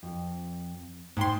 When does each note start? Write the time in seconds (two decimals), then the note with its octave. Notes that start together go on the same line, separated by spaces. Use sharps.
0.03 F2
1.17 G#2 A3 G5 C6